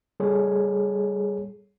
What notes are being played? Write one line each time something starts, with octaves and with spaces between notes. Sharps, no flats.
G3 G#4 A4 C#5